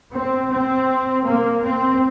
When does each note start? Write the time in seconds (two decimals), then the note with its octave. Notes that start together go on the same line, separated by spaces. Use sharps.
0.12 C4
0.50 C4
1.24 A#3
1.63 C4